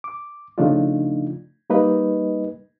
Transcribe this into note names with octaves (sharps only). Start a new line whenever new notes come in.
D6
C#3 F3 A3 D4 D#4 F4
G3 A#3 D#4 B4 D#5